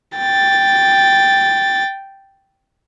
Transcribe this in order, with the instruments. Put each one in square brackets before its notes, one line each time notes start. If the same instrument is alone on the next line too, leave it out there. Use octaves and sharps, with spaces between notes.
[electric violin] G5 A6